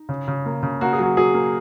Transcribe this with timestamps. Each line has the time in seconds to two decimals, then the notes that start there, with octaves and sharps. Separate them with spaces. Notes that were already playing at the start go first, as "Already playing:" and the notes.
Already playing: D#4
0.09 C#3
0.28 C#3
0.46 A#3
0.63 C#3
0.81 A#3 F#4
0.93 G#4
0.99 F#3 F#4
1.17 F#3 G#4
1.34 A#3